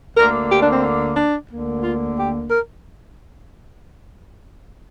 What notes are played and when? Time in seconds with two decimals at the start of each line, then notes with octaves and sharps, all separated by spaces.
0.17 D2 D3 A#3 A#4
0.51 G4
0.62 D4
0.73 C4
1.17 D4
1.50 D2 D3 A#3
1.83 F4
2.16 G4
2.49 A#4